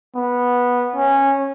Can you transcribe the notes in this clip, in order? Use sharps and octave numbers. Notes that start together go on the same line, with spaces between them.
B3
C#4